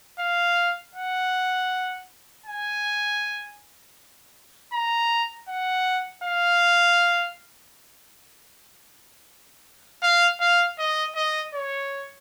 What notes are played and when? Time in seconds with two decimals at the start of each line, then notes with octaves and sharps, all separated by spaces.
0.19 F5
0.95 F#5
2.46 G#5
4.73 A#5
5.48 F#5
6.24 F5
10.03 F5
10.40 F5
10.79 D#5
11.16 D#5
11.54 C#5